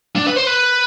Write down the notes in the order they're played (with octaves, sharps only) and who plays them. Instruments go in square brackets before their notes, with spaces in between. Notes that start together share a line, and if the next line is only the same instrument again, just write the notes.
[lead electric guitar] D4
B4
C5
B4